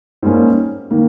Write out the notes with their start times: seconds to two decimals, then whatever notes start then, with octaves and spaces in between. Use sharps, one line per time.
0.23 G#2 G3 A#3 C#4
0.91 D#3 A#3